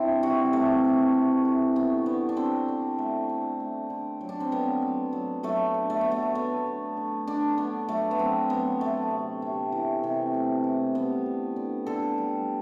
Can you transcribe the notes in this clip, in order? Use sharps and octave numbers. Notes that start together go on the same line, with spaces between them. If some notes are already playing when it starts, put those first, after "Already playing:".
Already playing: E3 C4 D4 E4
C3 F#4
C3 A3
A3
C3
E3
A3 B3
D3 B3
D4
D3 C4
D3
A3
D3
A3
D3
F#3
D4
C4
D3 B3
F#3
F#3
F#3 A3
D3
A3
A3 B3
A3
D3 B3
D3
D3
D3 D4
D3 B3
F#3 A3
B3
F#3 C4
F#3 B3
D3 A3
C3
C3
E3
C3
A3
E3
G3 B3
D3
D3
D3 A4
G3